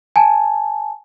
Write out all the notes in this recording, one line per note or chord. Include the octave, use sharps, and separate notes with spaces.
G#5 A5